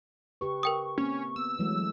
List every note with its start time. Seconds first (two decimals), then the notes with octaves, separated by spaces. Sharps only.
0.41 C#3 G4 B4 C#6
0.63 A#4 G5 D#6
0.98 A#3 C4 C#4
1.36 B3 E6
1.59 E3 F#3 G#3 A3